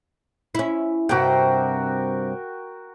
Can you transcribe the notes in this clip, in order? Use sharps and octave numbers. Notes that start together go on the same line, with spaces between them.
C#4 E4
G2 C3 F#4 A#4 G5